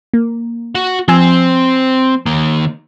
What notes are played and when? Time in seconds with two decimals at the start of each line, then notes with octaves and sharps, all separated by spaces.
0.13 A#3
0.75 F#4 F#5
1.08 F3 C4 G#5 E6
2.26 D#3 A#3